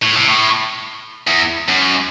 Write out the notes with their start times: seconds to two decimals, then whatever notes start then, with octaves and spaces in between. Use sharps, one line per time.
0.03 A2
0.16 C3
0.28 A2
1.27 E2
1.68 F#2